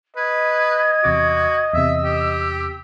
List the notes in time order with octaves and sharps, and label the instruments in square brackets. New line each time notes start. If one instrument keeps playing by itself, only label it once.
[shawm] B4 [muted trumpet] D#5 [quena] G#6
[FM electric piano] E2 C3 D6 [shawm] F#4
[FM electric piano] E2 C3 [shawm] E5 [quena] E6
[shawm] G4